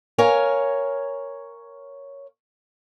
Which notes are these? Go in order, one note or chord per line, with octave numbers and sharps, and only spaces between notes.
A#4 C#5 F5 G#5